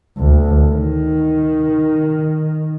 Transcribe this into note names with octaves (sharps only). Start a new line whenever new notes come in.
D2
D#3